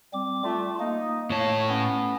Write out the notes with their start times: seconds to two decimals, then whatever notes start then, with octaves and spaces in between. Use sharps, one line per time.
0.13 G3 C4 D6
0.44 A3 F4
0.80 A#3 D#4
1.30 A2 C#5 A5
1.69 B3 C#4